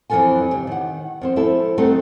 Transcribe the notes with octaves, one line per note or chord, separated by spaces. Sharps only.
F2 E3 F#3 F4 A4 G#5
C#3 G4
D#3 F#5
F2 C4 C5
F3 E4 A4
F#3 G3 A3 C4 D#4 A4